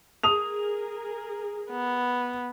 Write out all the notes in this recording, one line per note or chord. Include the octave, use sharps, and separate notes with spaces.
G#4 A#4 D#6 F7
B3